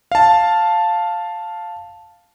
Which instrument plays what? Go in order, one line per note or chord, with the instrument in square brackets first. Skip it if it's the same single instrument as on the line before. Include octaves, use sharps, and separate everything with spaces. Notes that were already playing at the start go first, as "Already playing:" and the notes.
[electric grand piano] F5 A5